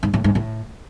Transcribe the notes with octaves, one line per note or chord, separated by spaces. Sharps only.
G#2
A2
G#2
A2